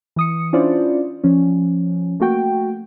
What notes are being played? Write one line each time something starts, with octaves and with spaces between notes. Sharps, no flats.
E3 D#6 C#7
C#4 D4 E4 F4 C5 D5
F3 C#4
A3 A#3 F#4 G5